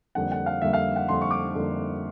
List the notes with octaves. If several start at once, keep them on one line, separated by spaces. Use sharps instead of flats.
F2 D3 G3 A#3 F#5
F#5
F5
F2 D3 G3 A#3 E5
F5
F#5
F2 D3 G3 A#3 C6
C#6
D6
F2 D3 G3 A#3